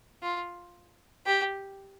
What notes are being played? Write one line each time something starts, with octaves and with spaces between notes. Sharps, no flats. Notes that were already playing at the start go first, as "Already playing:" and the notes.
F4
G4